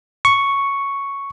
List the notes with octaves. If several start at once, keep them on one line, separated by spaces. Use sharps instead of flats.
C#6